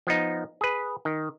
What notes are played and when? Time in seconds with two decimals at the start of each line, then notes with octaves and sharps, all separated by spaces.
0.07 F3 B3 D#4
0.61 G#4 B4
1.05 D#3